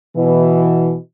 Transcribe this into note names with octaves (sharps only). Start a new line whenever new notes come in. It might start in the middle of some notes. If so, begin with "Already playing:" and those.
B2 E3